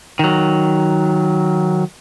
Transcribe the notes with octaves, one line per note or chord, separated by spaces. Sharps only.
D#3 F#3